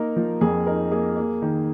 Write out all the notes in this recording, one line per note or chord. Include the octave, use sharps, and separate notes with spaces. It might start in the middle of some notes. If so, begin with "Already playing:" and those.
Already playing: A#3 D#4 A#4
F3
F2 G#4
D#4 A#4
A#3 G#4
A#3
D#3